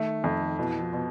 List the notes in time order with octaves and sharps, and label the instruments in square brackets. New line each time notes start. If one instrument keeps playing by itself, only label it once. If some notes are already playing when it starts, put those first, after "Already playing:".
Already playing: [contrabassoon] D#3 [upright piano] A3
[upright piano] F2
[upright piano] B2 [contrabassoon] E3
[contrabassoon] F3
[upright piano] B2